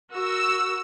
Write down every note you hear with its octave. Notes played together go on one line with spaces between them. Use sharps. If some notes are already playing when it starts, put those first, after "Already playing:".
F#4 A#4 E6